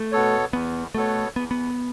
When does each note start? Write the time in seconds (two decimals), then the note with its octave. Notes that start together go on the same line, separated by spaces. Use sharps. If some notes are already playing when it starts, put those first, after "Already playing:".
Already playing: A3
0.12 B2 B3 A4 C#5
0.53 E2 B3
0.94 B2 A3 B3 A4 C#5
1.36 E2 B3
1.51 B3